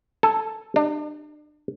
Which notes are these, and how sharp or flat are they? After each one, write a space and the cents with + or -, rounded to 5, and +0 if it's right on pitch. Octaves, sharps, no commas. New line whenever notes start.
A4 +0 G#5 +0
D4 +35 G4 +0